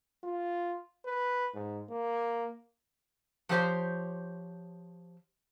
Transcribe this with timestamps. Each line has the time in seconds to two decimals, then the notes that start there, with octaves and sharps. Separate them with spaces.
0.24 F4
1.05 B4
1.55 G#2
1.90 A#3
3.49 F3 A3 G4 G#4 C5 C#5